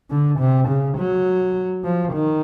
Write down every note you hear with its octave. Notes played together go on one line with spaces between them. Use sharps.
D3
C3
C#3
F#3
F3
D#3